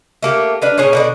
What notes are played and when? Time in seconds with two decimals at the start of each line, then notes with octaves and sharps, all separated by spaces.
0.22 A3 A#3 G4
0.62 D4 B4 F5
0.78 A#2 C#4 G#4 C#5
0.93 B2 D3 D4